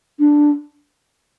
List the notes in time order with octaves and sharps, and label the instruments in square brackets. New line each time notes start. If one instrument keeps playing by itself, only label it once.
[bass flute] D4